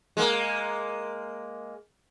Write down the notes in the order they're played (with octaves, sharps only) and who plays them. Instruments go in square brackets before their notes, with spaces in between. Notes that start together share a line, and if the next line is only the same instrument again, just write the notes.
[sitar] G#3 A#3